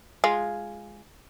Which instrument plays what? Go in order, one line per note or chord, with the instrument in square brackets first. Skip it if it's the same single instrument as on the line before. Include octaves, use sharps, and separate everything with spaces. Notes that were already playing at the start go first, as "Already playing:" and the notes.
[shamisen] G#3 F4